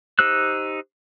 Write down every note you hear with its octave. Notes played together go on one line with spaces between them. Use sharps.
D#4 G4 C5 E6 F#6